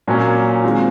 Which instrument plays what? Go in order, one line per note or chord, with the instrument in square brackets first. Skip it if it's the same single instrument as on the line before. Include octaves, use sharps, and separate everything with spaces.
[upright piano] A#2 F#3 A#3 C#4
D#3 G#3 C4 F4